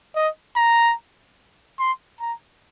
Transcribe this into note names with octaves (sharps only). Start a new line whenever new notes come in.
D#5
A#5
C6
A#5